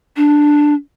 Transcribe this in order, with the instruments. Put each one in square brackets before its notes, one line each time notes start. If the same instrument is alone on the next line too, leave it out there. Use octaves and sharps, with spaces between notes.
[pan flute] D4